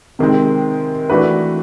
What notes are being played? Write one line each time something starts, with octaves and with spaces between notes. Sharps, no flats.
C3 D#3 G#3 C4
E3 A3 D4 F#4 B4